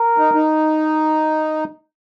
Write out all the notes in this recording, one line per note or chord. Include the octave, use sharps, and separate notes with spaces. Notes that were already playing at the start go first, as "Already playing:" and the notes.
Already playing: A#4
D#4
D#4